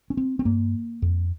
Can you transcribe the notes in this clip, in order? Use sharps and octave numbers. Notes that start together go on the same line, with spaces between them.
C#4
C4
C4
G2 A#3
F2